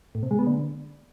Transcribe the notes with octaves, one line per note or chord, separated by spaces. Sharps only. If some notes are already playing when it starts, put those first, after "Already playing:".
A2
C3
G#3
B3
D3